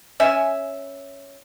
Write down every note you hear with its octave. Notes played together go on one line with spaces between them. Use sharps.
C#4 E5 G#5